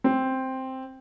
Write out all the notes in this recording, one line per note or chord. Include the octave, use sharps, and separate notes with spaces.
C4